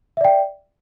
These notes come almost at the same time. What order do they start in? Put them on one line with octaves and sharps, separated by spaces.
E5 D5 G5